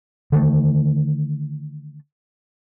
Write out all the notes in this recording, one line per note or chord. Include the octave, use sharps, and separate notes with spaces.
D3 D#3 A3